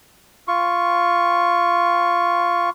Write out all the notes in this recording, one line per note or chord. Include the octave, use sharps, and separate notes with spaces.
F4 C#6